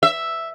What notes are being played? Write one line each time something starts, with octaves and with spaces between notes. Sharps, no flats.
E5